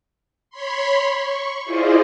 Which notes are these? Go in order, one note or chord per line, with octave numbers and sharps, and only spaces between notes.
C#5 B5 C6
C#6
E4 F4 G#4 C5 D5 D#5